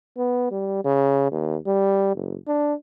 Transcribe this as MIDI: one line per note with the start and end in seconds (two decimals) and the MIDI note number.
0.17 0.49 59
0.51 0.81 55
0.84 1.30 49
1.31 1.57 39
1.66 2.15 55
2.15 2.36 30
2.48 2.74 62